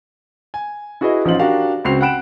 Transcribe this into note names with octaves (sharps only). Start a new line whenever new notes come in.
G#5
E4 F#4 G#4 B4 D#5
A1 F3 D#4 F4 C5 F#7
D4 F#4 G4 A#4 F5
C#2 C4 F#4 C7 F7
F#5 G5 B5 F#6 D7 E7